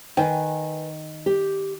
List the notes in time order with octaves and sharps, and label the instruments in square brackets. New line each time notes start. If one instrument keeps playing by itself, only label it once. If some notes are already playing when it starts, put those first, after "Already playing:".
[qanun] D#3 [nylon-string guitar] B4 G5 G#5
[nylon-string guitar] G4